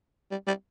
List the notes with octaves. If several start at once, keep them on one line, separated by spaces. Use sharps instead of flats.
G3
G3